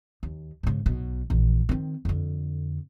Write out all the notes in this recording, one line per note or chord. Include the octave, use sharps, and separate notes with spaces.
D#2
G#2 C#3
B1 B2
A#1 E3
D#3 C4
F2 D3